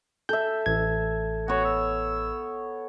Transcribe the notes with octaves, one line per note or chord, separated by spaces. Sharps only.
A4 E5 G6
A1 G#6
B3 F#4 C#5
E6